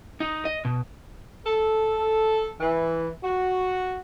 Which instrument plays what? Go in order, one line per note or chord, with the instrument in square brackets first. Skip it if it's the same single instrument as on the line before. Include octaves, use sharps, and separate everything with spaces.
[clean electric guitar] D#4
D#5
B2
[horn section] A4
E3
F#4